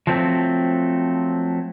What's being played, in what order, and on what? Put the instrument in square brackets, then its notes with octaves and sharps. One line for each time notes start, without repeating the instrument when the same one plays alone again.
[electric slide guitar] F3 F#3 A3 C4